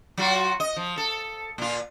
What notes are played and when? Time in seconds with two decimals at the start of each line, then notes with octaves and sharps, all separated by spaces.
0.17 F#3 F4 F#4
0.60 D#5
0.76 F3
0.97 A4
1.58 A#2 F4